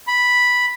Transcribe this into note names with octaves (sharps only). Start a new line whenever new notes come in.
B5